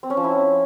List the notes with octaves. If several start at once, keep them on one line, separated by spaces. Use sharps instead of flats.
C4
C#4
F3
E4